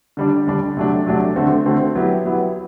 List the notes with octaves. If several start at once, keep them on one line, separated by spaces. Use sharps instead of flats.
D3 G3 D4
D3 G3 D4
C3 F#3 A3 D4
C3 F#3 A3 D4
D3 A3 C4 F#4
D3 A3 C4 F#4
F#3 B3 E4 G4
F#3 B3 E4 G4